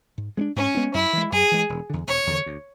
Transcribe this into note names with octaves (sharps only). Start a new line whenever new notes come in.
G#2
G#3 B3 D4
G#2 C#4
G#3 B3 D4
F#2 E4
E3 G#3
F#2 G#4
E3 G#3
E1
E2 D3
E1 C#5
E2 D3
D2